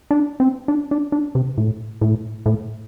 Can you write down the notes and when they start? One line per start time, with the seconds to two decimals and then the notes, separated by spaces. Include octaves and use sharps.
0.11 D4
0.40 C4
0.68 D4
0.91 D4
1.12 D4
1.35 C3
1.58 A2
2.01 A2
2.46 A2